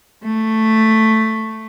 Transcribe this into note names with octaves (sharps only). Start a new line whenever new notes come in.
A3